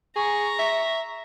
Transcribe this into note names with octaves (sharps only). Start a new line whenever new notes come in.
G#4 A#5 C#6
E5